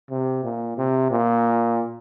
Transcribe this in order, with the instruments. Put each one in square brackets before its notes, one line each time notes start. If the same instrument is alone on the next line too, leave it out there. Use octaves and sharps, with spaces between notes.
[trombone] C3
A#2
C3
A#2